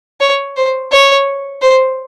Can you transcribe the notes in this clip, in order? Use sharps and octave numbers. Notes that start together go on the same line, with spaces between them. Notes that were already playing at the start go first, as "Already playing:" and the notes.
C#5
C5
C#5
C5